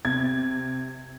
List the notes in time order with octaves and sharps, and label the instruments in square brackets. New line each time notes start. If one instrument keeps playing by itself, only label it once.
[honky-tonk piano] C3 G#6